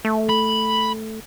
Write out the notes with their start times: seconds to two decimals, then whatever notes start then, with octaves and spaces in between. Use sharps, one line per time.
0.05 A3
0.29 B5